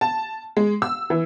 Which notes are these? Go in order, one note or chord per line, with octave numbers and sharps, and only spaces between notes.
A5
G#3
E6
E3